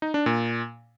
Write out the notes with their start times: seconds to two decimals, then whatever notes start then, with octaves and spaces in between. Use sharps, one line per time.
0.02 D#4
0.14 D4
0.26 A#2